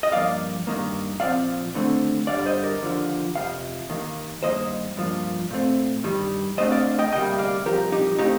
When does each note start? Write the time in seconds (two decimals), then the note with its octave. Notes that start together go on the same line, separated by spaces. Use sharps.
0.03 D#5
0.12 G2 F3 A#3 D5 F5
0.67 G2 D#3 A#3
1.20 A#2 F3 C4 D5 F5
1.74 D#2 D3 A3 C4
2.27 G2 D3 G3 D5 F5
2.46 C5 D#5
2.63 A#4 D5
2.82 D#2 D3 F3
3.35 F2 C3 F3 F5
3.90 D#2 D#3 A#3
4.43 G2 D#3 A#3 C5 D#5
4.97 G2 F3 A#3
5.51 A#2 A3 C4
6.04 G2 D#3 G3
6.57 D2 D3 A3 C4 C5 D#5
6.71 D5 F5
6.99 D#5 G5
7.12 D2 C3 G3 A#3 D#5 G5
7.38 D5 F5
7.65 C2 A#2 F3 G4 A#4
7.92 D#4 G4
8.18 A#2 A3 C4 D#4 G4